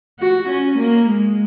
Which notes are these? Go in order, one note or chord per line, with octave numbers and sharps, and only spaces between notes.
F#4
C#4
A#3
G#3